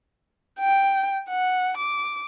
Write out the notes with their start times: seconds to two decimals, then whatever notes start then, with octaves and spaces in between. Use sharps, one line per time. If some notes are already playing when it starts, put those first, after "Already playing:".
0.59 G5
1.30 F#5
1.77 D6